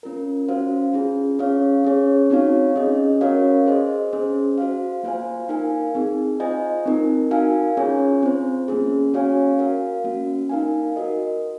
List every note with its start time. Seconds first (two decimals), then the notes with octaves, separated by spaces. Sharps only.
0.03 C#4 F4 A#4
0.48 C#4 F#4 C5 F5
0.94 C#4 F4 G#4
1.39 C#4 G#4 C#5 F5
1.84 C#4 G#4 C#5
2.30 C4 D#4 F#4 C#5 F5
2.76 C#4 G#4 D#5
3.21 C#4 F#4 A#4 C#5 F5
3.66 G#4 C5 D#5
4.13 C#4 G#4 C5
4.58 F#4 C5 F5
5.03 A#3 F4 C5 F5 G#5
5.48 D#4 A#4 F5 G#5
5.95 C4 D#4 G#4
6.40 F4 C5 D#5 G#5
6.86 C4 D#4 A#4
7.31 D#4 F#4 A#4 F5 G#5
7.77 C#4 F4 G#4 C#5 G#5
8.23 C4 F4 C5
8.68 A#3 C#4 G#4
9.14 C#4 F#4 C#5 F5 G#5
9.59 F#4 A#4 F5
10.04 A#3 C#4 F#4
10.50 D#4 A#4 F5 G#5
10.96 F#4 A#4 D#5